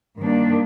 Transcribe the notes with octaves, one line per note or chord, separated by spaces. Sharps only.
G2 D#3 A#3 D4